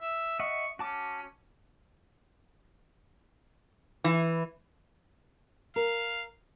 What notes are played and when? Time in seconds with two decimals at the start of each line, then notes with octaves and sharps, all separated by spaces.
0.01 E5
0.40 D#5 E5 F#5 C#6
0.79 C#4 F#4 A5 D6
4.04 E3
5.76 A#4 F5